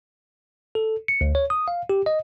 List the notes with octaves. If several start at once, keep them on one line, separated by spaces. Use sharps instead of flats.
A4
C#7
D2
C#5
D#6
F5
G4
D#5